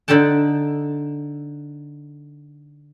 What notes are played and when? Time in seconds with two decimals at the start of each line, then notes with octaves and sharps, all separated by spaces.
0.08 D3 D#4 A4 G5 A5